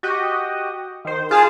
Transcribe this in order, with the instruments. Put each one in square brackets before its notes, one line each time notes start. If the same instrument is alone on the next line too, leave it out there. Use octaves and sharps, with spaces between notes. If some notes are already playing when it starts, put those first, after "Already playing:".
[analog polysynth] F#4 G4 D#5
D#3 C5
[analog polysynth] F4 A5 [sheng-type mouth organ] G#4